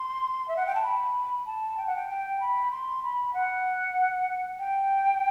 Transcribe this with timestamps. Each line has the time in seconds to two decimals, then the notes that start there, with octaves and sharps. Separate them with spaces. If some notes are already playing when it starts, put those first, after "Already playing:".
Already playing: C6
0.48 E5
0.57 F#5
0.66 G5
0.75 A5
0.83 B5
1.46 A5
1.77 G5
1.87 F#5
1.96 G5
2.10 G5
2.41 B5
2.71 C6
3.03 B5
3.34 F#5
4.59 G5